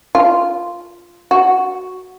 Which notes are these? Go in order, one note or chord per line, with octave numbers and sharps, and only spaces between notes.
F4
F#4